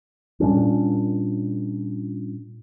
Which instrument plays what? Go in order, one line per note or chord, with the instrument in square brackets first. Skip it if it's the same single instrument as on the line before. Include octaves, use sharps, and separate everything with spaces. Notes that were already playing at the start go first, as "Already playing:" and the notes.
[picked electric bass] A#2 G3 C#4 D4